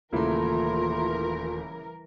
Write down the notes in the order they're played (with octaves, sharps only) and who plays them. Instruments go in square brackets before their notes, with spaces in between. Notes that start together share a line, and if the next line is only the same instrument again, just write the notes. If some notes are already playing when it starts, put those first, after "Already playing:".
[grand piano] D#1 A3 [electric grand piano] C#3 A#3 E4 [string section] E3 A#4 [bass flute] F4